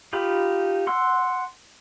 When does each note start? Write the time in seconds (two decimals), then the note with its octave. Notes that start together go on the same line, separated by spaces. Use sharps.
0.13 D#4 F4 G4 B5
0.87 F#5 C6 E6